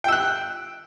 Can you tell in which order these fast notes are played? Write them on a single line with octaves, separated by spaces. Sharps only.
G5 E6 F#6